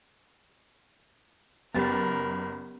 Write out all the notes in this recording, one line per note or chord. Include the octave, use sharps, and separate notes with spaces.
F#1 B3 G4 A#4 B5 A6